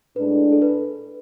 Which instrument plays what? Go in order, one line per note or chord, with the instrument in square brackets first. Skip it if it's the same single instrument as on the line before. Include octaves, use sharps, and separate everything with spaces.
[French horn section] A2 G#3 D4 [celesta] B4
[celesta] A4
B4